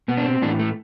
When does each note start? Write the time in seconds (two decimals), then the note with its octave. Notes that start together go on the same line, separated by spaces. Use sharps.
0.08 B2 B3
0.17 D4
0.25 C4
0.42 A2 E3 D4
0.59 A3